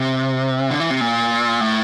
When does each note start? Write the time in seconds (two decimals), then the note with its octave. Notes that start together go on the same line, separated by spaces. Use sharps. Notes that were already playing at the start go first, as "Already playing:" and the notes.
Already playing: C3
0.70 D3
0.80 E3
0.90 C3
1.01 A#2
1.61 A2